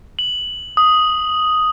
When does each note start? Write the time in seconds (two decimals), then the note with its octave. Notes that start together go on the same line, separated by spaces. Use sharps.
0.19 F#7
0.77 D#6